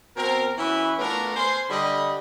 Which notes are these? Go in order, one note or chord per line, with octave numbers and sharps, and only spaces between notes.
B2 C4 A#4
E3 C#4 E4 F#4 B4
A3 B3 D4 F4 A#4
C5 G#5 C6
D3 G3 D#5 B5